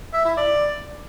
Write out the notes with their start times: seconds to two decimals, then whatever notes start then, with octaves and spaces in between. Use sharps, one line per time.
0.13 E5
0.25 E4
0.37 D5